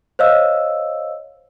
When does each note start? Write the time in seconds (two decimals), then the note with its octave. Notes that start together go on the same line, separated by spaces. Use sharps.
0.19 C5 C#5 D#5 F5 E6